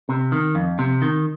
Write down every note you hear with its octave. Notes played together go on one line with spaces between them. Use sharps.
C3
D#3
F2
C3
D#3